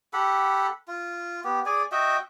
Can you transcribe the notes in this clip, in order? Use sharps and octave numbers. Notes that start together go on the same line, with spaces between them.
G4 A4 F#5 B5
F4
B3 G4
G#4 D5 G#5
F#4 D#5 E5 G5